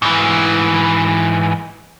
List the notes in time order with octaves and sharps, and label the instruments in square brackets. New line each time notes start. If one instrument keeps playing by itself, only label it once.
[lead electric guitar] G#2 E3